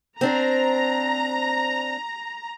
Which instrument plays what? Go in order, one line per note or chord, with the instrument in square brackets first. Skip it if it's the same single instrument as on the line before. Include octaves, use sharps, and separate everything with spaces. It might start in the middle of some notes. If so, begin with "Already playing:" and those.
[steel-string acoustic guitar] C4 D4 C5 [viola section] A#5